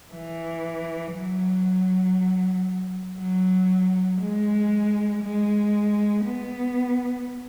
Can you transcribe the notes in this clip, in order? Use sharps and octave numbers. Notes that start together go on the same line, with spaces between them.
E3
F#3
F#3
G#3
G#3
B3